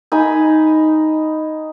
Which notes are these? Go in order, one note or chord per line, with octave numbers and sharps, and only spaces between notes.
D#4 G#5 B5